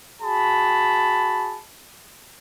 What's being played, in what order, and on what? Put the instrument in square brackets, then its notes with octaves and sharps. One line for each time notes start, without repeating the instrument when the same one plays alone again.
[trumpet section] F#4 G#4 A5 B5